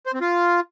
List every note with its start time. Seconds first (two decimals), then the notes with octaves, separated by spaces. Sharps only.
0.06 C5
0.14 C4
0.21 F4